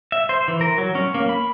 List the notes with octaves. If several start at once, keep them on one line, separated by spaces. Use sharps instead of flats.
E5
C5
E3
A#4
F#3
C#4
A#3
B5